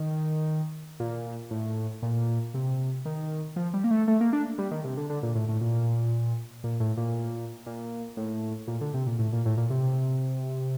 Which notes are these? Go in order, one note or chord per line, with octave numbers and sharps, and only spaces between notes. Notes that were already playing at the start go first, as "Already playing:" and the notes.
Already playing: D#3
A#2
A2
A#2
C3
D#3
F3
G3
A#3
A3
A3
A#3
D4
G3
D#3
C3
D3
D3
A#2
A2
A2
A#2
A#2
A2
A#2
A#2
A2
A#2
D3
C3
A#2
A2
A#2
A2
A#2
C3